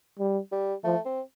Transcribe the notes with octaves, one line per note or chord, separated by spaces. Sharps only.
G3
G3
F3 A3
C4